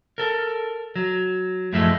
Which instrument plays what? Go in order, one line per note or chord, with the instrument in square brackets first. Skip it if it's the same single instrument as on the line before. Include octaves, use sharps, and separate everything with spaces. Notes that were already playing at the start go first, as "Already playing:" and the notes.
[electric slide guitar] A4 A#4
F#3
F#2 A2 F3 G#3 A3 E4